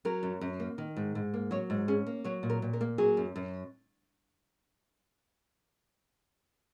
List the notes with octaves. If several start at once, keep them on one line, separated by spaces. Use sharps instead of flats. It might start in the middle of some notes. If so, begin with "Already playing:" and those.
F#3 A#4
F#2
F#2
A#3
D#3
G#2
G#2
A#3
F#3 C#5
G#2
C#4 G#4
A#3
F#3 C#5
A#2
A#4
A#2
A#4
A#3
F#3 G#4
F#2
F#2